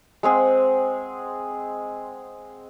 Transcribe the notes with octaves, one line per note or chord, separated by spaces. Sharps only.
G#3 C4 G#4 F#5